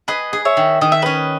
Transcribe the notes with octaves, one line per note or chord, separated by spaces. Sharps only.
G#4 B4 D#5
G#4
C#5 E5
D#3
D#3 D#5
E5
C#4 B4 D#5